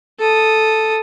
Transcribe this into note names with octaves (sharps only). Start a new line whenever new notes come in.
A4 D#6